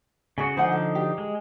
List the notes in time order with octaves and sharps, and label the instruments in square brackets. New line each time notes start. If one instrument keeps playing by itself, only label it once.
[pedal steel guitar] C#3 F#4 [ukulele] G#4 G#5
[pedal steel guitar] D3 F3 D#4 [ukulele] C5 F#5 G#5
[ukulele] A4
G4
[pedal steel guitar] G#3